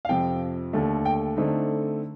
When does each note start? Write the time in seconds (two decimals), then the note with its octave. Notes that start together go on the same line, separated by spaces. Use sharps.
0.05 F5
0.09 F2 C3 F3 G5
0.73 D#2 D3 A3
1.05 G5
1.37 D3 A3 C4 D#4